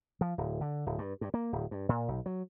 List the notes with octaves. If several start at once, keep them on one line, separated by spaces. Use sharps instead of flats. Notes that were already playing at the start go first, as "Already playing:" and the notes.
F3
D1
D3
D1
G2
G2
A#3
D1
G2
A#2
B1
F#3